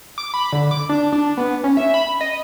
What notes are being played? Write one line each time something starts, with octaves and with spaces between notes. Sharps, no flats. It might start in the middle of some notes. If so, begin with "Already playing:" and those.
D6
B5
D3
D6
D4
D4
B3
C#4
E5
B5
D#5